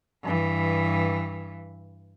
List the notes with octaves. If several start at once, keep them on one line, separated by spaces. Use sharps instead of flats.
G2 E3